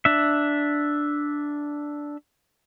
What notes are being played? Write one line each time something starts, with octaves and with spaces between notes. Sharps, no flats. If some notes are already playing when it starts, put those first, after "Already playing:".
D4 E5